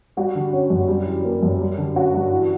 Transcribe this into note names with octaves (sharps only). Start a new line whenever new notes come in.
G3 F#4
D3
C#4
F#2
G3
E3
A#3
F#2
G3
D3
C#4 F#4
G2
E3